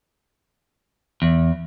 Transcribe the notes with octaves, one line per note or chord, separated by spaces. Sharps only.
E2